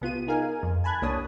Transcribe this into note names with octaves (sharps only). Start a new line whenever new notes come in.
C2 B3 F4 D#7
D#4 G#4 A#4 F5 G#5
F2
G#5 A5 B5 F#6 G#6
C2 A#3 D4 C#5 A5 D#6